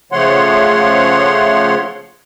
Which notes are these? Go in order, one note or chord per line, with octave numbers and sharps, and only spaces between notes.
C#3 F3 A3 C#5 F#5 C6